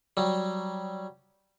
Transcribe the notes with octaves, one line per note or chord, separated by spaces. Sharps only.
F#3 G3